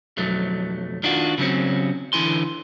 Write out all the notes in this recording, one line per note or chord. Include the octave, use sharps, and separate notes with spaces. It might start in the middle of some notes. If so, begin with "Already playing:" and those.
B1 F2 F#3 A3
D#3 D4 F4 F#4
C#3 F#3 G3 C4 C#4
D3 E3 E4 G#5 C6